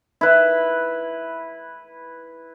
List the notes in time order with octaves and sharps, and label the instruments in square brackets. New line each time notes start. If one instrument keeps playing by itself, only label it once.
[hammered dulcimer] E4 B4